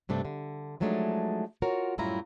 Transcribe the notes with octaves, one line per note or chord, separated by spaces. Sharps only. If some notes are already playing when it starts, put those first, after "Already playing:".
G2 C3 A3 D4
D3
F3 F#3 G#3 A3 D4 D#4
F4 F#4 A#4 C#5
F#2 A2 G3 E4 F4 A#5